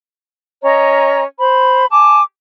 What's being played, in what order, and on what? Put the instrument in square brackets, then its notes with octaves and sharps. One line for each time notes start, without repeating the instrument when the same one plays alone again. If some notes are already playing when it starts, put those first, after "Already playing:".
[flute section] C#4 C#5 D#5 A#5
C5 B5
G#5 A5 D6